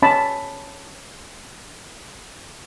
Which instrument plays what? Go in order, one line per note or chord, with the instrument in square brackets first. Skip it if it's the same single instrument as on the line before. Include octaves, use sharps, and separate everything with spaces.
[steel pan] C#4 A5 B5